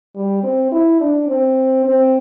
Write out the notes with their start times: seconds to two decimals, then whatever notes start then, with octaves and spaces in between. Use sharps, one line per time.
0.16 G3
0.43 C4
0.72 E4
1.00 D4
1.28 C4
1.85 C4